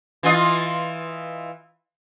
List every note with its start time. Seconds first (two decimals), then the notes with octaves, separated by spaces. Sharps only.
0.23 E3 F4 D#5